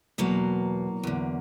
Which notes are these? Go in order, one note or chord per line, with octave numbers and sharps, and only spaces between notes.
E2 B2 F#3 A#3
E2 D3